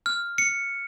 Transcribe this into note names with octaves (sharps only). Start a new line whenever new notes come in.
F6
C#7